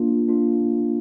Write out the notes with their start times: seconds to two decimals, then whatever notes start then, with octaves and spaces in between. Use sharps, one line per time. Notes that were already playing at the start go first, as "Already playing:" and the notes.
Already playing: A#3 D4 F4
0.28 A#3 D4 F4